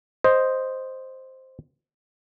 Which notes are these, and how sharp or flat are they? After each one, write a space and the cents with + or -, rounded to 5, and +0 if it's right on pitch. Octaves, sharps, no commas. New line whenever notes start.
C5 +0 D#5 +0